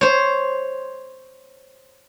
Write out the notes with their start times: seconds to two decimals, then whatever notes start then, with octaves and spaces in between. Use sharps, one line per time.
0.01 C5 C#5